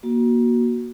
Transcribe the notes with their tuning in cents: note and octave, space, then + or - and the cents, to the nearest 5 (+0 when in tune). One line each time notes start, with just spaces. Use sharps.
A#3 +30 F#4 +0